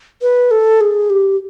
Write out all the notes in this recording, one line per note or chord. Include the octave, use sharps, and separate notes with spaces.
B4
A4
G#4
G4